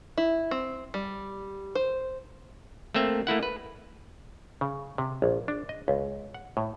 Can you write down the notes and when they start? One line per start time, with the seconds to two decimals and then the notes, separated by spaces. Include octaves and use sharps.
0.18 E4
0.51 C4
0.94 G3
1.75 C5
2.94 A3 A#3 C4 E5
3.27 A3 A#3 E4 F#5
3.43 B4
4.61 C#3
4.98 C3
5.22 A#1
5.48 D4
5.69 D#5
5.88 C#2
6.34 F#5
6.57 A2